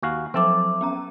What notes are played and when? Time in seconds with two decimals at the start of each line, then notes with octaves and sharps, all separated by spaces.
0.03 D#2 F#4 F5 G#5
0.34 F3 F#3 C4 A4 E5 D6
0.81 B3 C#4 A#5